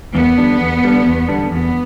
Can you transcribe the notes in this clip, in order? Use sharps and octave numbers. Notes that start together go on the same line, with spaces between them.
E2 B3
D3 G3 D4
E2
D3 G3 D4
E2
D3 G3 D4
E2 B3